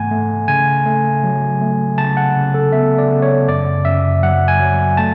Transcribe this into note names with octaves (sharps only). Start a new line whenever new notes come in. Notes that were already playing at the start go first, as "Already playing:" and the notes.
Already playing: G#2 E3 A3 F#5 G#5
A3
C#3 G#5
A3
F#3
A3
C#3 A5
F#5
C#3
A4
B3 E5
D5
C#3
C#5
F#2 D5
F#2 E5
F#3 F#5
G#5
F#3
A3 A5